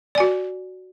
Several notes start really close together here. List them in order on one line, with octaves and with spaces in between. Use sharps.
D5 G#5 F#4